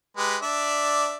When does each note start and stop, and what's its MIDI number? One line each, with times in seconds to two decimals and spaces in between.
0.17 0.37 56
0.17 0.37 67
0.17 0.37 71
0.42 1.16 62
0.42 1.16 74
0.42 1.16 76